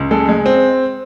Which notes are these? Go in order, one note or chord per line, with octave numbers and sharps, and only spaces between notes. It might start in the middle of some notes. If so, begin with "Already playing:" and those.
Already playing: C#2
G#3 A4
G#3
C4